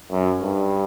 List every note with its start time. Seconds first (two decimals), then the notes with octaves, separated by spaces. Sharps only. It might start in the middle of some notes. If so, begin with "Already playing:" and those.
0.12 F#2
0.41 G2